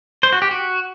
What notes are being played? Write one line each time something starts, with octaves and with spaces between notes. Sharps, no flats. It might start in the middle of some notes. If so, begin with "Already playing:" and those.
C5
F#4
G4
F#4